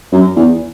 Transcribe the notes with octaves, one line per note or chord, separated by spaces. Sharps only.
F#2
E2